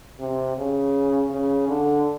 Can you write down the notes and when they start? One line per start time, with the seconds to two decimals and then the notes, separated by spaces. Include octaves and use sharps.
0.20 C3
0.57 C#3
1.30 C#3
1.68 D3